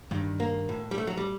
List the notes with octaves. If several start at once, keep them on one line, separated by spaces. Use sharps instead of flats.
G2 D#3
A#3
A2
G3
A3
F#3
G3